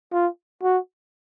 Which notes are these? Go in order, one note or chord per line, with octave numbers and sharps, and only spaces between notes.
F4
F#4